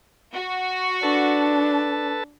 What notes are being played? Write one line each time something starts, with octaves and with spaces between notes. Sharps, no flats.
F#4
D4 A4 B4 A5